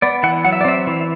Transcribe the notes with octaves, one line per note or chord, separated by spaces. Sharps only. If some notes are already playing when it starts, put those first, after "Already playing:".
B3 D5
E3 F#5
F#3 F#5
E5
D5
C4 E5
E3